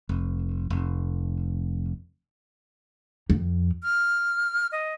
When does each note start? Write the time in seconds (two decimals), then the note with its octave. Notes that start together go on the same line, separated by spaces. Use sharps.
0.09 F1
0.70 F1
3.30 F2
3.83 F6
4.72 D#5